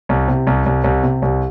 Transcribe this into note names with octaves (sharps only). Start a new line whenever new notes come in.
C2
C3
C2
C2
C2
C3
C2